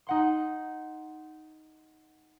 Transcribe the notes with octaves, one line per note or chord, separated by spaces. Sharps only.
D#4 F#5 C6